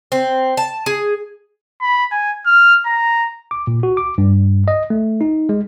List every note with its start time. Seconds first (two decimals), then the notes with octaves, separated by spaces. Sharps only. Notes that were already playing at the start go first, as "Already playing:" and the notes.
0.12 C4
0.57 A5
0.86 G#4
1.81 B5
2.12 G#5
2.46 F6
2.86 A#5
3.51 D6
3.67 A#2
3.83 F#4
3.97 D6
4.18 G2
4.68 D#5
4.90 A3
5.21 D#4
5.49 G#3